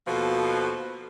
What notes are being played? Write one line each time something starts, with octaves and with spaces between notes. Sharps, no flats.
D#2 B2 F3 F#4 A4